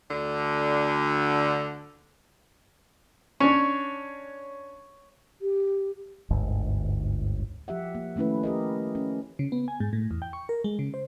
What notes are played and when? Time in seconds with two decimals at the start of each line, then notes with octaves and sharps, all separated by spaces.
0.10 D2 D3
3.40 C#4 D4 C#5
5.42 G4
6.30 G1 D2 G#2
7.68 F3 G4 E5 F#5
7.95 A#3
8.16 D#3 A3 C#4 E4 B4
8.43 G4 A#4 D#5
8.95 C#4
9.39 C#3
9.52 B3
9.68 G#5
9.80 G#2
9.93 A2
10.11 E2
10.22 G5
10.33 C#6
10.49 A#4
10.64 G#3
10.79 C#3
10.94 C5